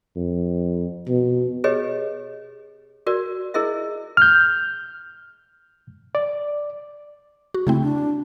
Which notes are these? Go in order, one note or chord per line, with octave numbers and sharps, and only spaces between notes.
F2
B2
G4 G#4 B4 C#5 D#5
F#4 A#4 D5
E4 G#4 A#4 D#5 E5
F6 G6
D5
F#4
C#3 A3 C4 E4
D4